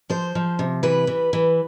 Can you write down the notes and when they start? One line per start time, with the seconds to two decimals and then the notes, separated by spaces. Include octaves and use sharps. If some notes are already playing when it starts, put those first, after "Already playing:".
0.10 F3 C5
0.35 F3
0.59 C3
0.83 E3 B4
1.07 E3
1.33 E3